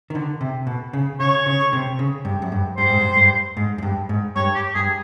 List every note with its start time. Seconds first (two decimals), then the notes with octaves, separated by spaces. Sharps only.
0.10 D#3
0.15 D3
0.41 C3
0.67 B2
0.93 C#3
1.20 C#3 C#5
1.46 C#3
1.73 C3
1.99 C#3
2.25 G2
2.42 F#2
2.52 G2
2.77 G2 C5
2.89 G#2
3.01 G2
3.17 G2
3.57 G#2
3.78 F#2
3.83 G2
4.09 G#2
4.36 G2 C#5
4.55 G4
4.75 G2 G#4